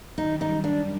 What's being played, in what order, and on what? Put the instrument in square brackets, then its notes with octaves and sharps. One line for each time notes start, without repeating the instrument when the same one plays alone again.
[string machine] F#2 D#3 G3 [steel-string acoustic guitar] D#4
[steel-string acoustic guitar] D#4
D4